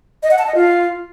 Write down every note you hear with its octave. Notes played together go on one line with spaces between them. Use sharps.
D#5
F#5
A5
D#5
F4